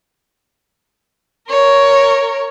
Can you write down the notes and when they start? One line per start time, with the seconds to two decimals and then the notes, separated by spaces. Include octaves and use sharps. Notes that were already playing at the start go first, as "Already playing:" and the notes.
1.49 A#4 C#5